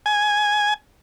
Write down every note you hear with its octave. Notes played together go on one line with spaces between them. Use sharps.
G#5